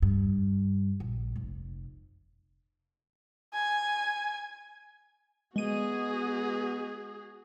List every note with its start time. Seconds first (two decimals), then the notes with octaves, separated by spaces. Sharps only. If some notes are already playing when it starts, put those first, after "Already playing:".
0.02 G2
1.00 A#1
1.36 F1
3.54 G#5
5.56 G#3 B3 F#4 G#4 D#7